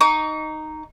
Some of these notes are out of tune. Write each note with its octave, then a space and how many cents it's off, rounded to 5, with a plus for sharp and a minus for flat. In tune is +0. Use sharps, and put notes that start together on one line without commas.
D#4 -5 C#6 +45